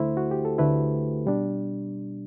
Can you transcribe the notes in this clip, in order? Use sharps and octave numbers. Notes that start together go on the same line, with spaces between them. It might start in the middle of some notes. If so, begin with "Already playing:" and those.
Already playing: D2 D3 A3 E4 C5
F#4
G4
A4
D2 D3 A3 E4 B4
B2 G3 D4